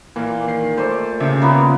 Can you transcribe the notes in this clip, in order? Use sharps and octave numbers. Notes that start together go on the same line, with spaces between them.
A#2 E3 A#3
D#3 C7
A3 C5 D5
D#2 A#2 C#3 E5
A#3 B3 F4